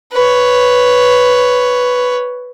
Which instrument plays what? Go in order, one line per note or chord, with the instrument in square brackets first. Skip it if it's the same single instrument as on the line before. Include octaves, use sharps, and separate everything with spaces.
[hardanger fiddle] B4 C#5